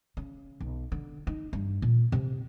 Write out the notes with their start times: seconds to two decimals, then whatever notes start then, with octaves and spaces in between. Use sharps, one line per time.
0.17 C#3
0.61 B1
0.92 D3
1.27 D#4
1.53 G2
1.82 A#2
2.12 C3